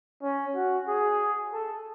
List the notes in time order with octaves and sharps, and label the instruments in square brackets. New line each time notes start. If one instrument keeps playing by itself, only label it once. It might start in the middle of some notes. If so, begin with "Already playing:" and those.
[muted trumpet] C#4
F#4
G#4
A4